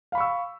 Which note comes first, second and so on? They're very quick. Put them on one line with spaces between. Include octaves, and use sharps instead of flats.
F5 B5 C#6 E6